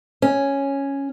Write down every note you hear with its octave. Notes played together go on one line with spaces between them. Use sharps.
C#4